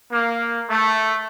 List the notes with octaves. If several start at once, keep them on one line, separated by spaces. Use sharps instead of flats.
A#3
A3